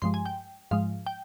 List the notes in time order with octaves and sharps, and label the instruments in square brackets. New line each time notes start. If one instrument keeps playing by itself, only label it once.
[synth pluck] G2 F3 G#3 C6
G#5
G5
G#2 F3 G#3 F5
G5